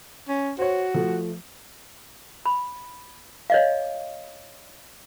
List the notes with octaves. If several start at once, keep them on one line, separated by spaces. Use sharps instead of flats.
C#4
F#4 C5 C#5
F3 A3
B5
C#5 D#5 F5